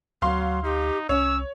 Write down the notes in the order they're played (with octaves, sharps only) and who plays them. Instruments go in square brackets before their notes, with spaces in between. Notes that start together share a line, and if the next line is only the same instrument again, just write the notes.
[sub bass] D2 [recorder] F#3 [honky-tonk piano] F5 C6
[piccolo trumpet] D#4 [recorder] G4
[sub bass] C2 [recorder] C#4 [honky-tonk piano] C#5 [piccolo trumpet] E6